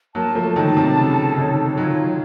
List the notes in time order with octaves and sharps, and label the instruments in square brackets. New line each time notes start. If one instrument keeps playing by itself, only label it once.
[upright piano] F#3 A#3 [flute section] A5
[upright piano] F3 A3
[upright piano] D#3 F#3 [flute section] A5
[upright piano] C3
[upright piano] C#3 [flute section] A4
[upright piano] C3 D#3 [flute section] C#5
[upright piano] D#3 F#3 [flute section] F4